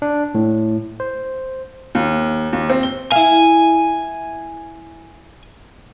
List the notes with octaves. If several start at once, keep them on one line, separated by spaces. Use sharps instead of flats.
D4
A2
C5
D#2
D#2
C4
G7
E4 F5 G#5